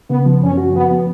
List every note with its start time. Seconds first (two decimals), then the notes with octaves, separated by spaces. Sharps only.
0.10 C#3 B3
0.26 F3
0.42 F#2 C#4
0.58 F#4
0.74 F3 B3
0.91 B3